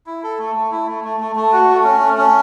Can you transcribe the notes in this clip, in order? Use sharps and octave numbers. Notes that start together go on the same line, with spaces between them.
E4
A4
A3
A3
E4
A3
A3
A3
A3
F#4
A3
C#4
A3
C#4